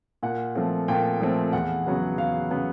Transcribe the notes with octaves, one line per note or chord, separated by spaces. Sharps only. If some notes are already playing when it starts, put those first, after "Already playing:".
A#2 F#5
F3 A3 C4
A#2 G5
F3 A3 C4
E2 F#5
C#3 F#3 B3
E2 F5
C#3 F#3 B3